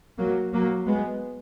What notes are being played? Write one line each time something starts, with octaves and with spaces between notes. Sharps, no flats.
F#3 A#3
F#3 A#3
G#3 B3